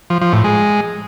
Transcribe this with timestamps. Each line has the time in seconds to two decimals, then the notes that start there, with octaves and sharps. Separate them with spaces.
0.10 F3
0.21 F3
0.33 A2
0.44 G#3